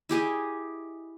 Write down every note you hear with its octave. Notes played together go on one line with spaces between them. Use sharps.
E4 G4 G#4 D#5